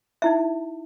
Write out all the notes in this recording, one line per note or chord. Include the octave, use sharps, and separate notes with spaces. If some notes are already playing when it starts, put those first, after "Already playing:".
D#4 E4 E5